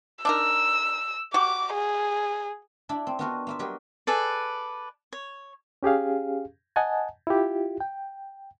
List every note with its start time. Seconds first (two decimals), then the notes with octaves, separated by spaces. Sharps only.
0.25 D4 D#4 A#4 E6
1.34 F#4 G4 D6
1.74 G#4
2.89 D4 E4 D5 B5
3.07 C4
3.19 B3 D4 F4 F#4 A#4 D#5
3.47 A#3 F4 E5
3.59 F#3 G3 G4 A#4 B4 D#5
4.07 G#4 A4 B4 D5
5.13 C#5
5.83 C#4 G4 G#4 F5
6.76 D#5 F#5 G#5 A5
7.27 E4 F4 G4
7.80 G5